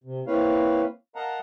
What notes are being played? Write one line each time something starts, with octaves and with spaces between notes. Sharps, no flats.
C3
A#3 C4 E4 B4 C#5 F5
A#4 D#5 F5 F#5 A5 A#5